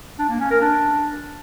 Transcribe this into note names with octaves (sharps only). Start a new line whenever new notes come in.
D4
A#3
C#4
A#4
D4